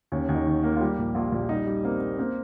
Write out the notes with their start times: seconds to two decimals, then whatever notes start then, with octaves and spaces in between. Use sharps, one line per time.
0.12 D#2 C#4
0.29 D#2
0.34 D#4
0.46 D#3
0.63 A#3
0.76 F4
0.81 G3 G4
0.98 A#1
1.15 A#1 F4
1.32 A#1
1.49 G3 D#4
1.67 G3
1.84 A#3 C4
2.01 A#3
2.18 A#3 C4